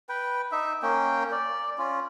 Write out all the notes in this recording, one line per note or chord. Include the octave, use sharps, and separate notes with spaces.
B4 G5
D#4 E5
A#3 C#4 G5
D5
C#4 F4